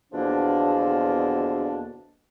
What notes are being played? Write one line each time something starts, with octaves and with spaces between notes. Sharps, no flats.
E2 B2 D3 F3 A#3 D4